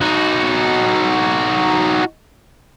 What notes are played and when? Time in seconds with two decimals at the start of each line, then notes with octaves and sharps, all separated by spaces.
0.01 D#4 F#4